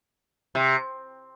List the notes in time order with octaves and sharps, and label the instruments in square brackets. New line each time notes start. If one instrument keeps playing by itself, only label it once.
[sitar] C3